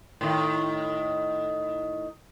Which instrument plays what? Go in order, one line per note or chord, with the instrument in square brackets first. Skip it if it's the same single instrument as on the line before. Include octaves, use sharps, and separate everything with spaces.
[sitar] A2 D#3